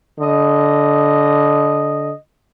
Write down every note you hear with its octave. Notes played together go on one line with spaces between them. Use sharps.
D3 D#5